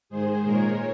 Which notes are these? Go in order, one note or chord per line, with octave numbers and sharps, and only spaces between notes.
G#2 D#3 G#3 G#4 C5
A#2 G#3 A#4 C#5